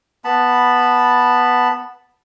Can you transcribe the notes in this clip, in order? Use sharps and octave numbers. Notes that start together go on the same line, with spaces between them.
B3 A5 B5